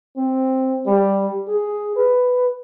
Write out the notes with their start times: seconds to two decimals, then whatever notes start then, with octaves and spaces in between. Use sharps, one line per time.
0.17 C4
0.86 G3
1.48 G#4
1.96 B4